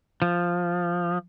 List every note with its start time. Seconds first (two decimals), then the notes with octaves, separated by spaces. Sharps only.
0.22 F3